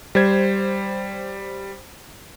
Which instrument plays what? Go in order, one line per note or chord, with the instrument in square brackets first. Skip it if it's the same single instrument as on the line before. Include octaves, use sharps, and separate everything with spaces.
[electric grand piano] G3 C5 G#6